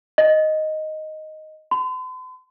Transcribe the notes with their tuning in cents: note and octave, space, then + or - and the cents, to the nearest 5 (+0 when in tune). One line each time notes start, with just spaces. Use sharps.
D#5 +0
C6 -45